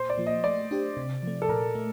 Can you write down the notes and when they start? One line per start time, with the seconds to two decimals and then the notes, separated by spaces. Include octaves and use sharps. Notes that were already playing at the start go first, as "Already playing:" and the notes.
Already playing: A#2 C5
0.10 D5
0.18 F3 A#3
0.26 D#5
0.44 A3 D5
0.71 D4 G4 C5
0.97 C3
1.23 F3 A3
1.42 A4
1.49 A#2 A#4
1.75 A3